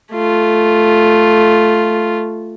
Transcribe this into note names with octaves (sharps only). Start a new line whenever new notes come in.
A3 F4